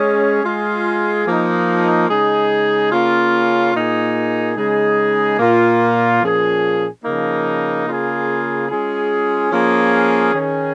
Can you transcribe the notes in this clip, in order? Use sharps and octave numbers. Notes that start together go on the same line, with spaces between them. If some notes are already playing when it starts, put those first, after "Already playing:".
Already playing: G#3 C#4 G#4
G#3 F4 G#4
F3 A#3 D#4
C#3 G#3 D#4 G#4
C#3 A#3 C#4 F4
A#2 A#3 D#4 G#4
C#3 G#3 D#4 G#4
A#2 A#3 F4
A#2 F3 C#4 G#4
C#3 F3 A#3 D#4
C#3 A#3 F4 G#4
G#3 C#4 F4 G#4
F3 A#3 C#4 F4 G#4
D#3 C#4 G#4